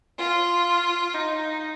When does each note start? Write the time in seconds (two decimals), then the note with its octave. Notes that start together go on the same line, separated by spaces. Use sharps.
0.18 F4
1.15 D#4